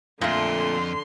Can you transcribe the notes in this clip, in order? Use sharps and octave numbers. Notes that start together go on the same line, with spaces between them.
F2 A#2 D3 A3 C6